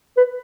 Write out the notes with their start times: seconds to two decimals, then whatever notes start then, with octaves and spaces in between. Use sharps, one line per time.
0.18 B4